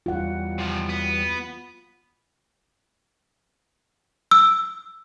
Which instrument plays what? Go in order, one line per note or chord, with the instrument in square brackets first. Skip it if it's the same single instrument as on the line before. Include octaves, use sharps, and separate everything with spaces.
[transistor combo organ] E2 F#3 G3 [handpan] F4 F#5
[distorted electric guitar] C3 F3
B3
[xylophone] E6